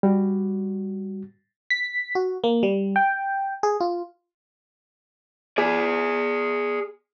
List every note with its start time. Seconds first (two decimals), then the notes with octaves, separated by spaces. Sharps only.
0.03 G3 F#4
1.70 B6
2.15 F#4
2.44 A#3
2.63 G3
2.96 G5
3.63 G#4
3.80 F4
5.58 G#4 D5